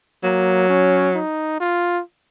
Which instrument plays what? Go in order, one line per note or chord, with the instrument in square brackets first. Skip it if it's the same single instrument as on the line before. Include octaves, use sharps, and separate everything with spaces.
[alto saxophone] F#3 [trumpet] A#3
[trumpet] C#4
D#4
F4